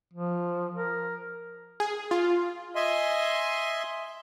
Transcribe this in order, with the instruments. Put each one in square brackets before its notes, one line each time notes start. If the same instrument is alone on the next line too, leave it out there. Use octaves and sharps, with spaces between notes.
[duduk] F3
A#4
[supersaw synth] G#4
F4
[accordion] D#5 E5 G#5 C6